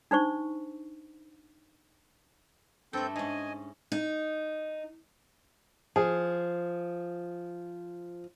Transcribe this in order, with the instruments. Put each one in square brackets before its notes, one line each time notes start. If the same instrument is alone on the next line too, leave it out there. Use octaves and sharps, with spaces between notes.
[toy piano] D4 D#4 C5 C#6
[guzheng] G2 A3 [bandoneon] C4 A4 G6
[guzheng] G#2 C#4 [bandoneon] D#5 G#5
[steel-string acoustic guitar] D#4
[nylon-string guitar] F3 [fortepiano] G#4